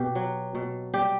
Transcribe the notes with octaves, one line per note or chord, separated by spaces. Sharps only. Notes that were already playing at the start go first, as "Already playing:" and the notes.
Already playing: B2 G4
F#3
B2
G3 G4